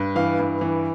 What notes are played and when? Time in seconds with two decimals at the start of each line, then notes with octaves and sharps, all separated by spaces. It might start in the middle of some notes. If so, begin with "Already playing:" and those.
Already playing: G2
0.15 E3 F5
0.39 G2
0.61 E3